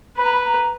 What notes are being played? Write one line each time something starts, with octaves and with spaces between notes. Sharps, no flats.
B4 B5
A#5
B5
A#5